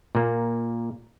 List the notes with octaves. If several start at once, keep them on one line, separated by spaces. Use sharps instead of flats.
A#2 A#3